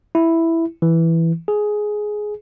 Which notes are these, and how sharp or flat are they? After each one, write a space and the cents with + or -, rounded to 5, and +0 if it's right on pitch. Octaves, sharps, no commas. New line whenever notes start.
E4 +0
E3 +0
G#4 +10